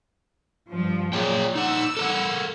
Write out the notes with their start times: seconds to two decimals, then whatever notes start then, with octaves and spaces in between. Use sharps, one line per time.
0.72 G2 F3
1.13 A#2 G#4 C#5 G5
1.55 D#4 F#5 E6
1.97 A4 A#4 F#5